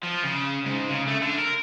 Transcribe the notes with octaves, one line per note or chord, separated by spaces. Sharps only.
F3
C#3
G#2
C#3
A3
D3
A#4